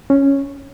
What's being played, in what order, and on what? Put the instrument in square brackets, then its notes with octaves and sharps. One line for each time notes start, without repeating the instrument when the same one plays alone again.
[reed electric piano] C#4